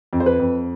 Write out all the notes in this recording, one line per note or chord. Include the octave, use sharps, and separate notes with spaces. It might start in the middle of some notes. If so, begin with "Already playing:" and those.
F2
C5
B4
F2